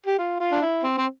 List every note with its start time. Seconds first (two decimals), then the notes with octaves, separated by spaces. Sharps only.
0.06 G4
0.19 F4
0.40 F4
0.52 D4
0.62 E4
0.83 C4
0.98 C4